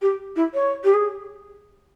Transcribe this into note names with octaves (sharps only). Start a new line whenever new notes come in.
G4
E4
C#5
G4
G#4